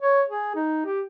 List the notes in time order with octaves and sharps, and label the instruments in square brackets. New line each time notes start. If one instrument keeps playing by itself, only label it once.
[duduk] C#5
G#4
D#4
G4